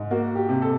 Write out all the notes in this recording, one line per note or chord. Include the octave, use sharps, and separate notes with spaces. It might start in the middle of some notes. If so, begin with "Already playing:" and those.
Already playing: G#2
A#3 F#4
G4
C3
A4